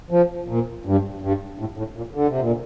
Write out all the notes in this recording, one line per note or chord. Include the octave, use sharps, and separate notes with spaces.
F3
A#2
G2
G2
A2
A2
A#2
D3
C3
A#2